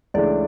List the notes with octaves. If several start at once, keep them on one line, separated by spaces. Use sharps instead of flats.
C#2 C#3 E3 A3 D4 D5